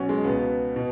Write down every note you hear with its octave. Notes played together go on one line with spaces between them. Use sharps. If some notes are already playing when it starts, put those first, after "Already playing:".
Already playing: B1 B2 C#4 F#4
G#3
C#2 B2 B3
B2